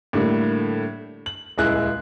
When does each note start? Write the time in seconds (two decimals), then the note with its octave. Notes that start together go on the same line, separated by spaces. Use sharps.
0.13 A2 D3 G3 A3 A#3
1.26 F#7
1.58 D#1 C#2 G#3 E4 F#6